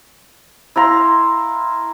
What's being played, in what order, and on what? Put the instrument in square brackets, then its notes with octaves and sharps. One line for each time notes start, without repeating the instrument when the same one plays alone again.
[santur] E4 F5 A#5 C6